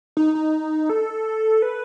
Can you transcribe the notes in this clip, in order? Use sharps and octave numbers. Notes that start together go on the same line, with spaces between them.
D#4
D#4
A4
B4